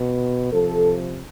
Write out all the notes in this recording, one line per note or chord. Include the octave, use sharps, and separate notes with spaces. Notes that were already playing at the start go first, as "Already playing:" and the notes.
Already playing: B2
C3 F3 A4